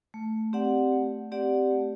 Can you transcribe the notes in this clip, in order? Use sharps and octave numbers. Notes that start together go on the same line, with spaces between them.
A3
C4 G4 D5 F#5
A3
C4 G4 D5 F#5
A3